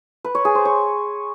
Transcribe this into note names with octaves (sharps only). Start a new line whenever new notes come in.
B4
C#5
G#4
C5
C#5